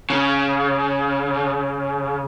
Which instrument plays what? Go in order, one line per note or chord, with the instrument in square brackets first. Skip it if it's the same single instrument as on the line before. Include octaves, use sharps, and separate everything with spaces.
[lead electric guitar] C#3